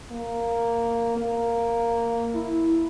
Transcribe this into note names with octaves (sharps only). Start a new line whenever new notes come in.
A#3
A#3
E4